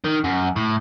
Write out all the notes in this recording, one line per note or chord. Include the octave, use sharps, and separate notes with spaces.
D#3
F#2
A2